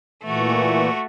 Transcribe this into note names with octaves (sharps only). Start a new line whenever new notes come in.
A#2 E3 A3 F#4